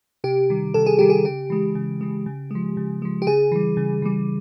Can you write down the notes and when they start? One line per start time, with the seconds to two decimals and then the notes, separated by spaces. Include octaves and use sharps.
0.24 C3 G4
0.50 D#3 G3
0.74 C3 A4
0.86 G#4
0.99 D#3 G3 G4
1.10 G#4
1.25 C#3 G4
1.50 E3 G#3
1.75 C#3
2.01 E3 G#3
2.26 C#3
2.51 F3 G#3
2.77 C#3
3.02 F3 G#3
3.22 G4
3.27 C#3 G#4
3.52 E3 G3
3.77 C#3
4.02 E3 G3